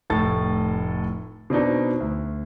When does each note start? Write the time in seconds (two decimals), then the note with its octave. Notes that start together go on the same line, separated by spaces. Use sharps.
0.10 F1 A2 A4 A6
1.50 B2 C4 D4 D#4
2.00 D2